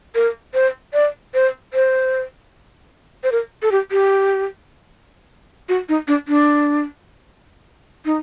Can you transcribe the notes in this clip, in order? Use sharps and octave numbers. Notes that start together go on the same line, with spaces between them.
A#4
C5
D5
C5
C5
C5
A#4
A4
G4
G4
F#4
D#4
D4
D4
D#4